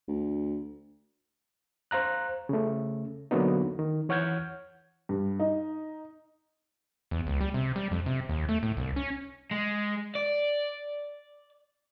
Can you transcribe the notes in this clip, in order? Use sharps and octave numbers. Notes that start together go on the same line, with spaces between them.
D2
C5 F5 A#5 F#6
C#3 A3
D3 F#3 A#3 B3 D#4
D#3
E3 C#5 F#5 F6 G6 G#6
G2
D#4
E2
C#2
G3
C3
G3
F2
C3
D#2
A3
A2
C2
C#4
G#3
D5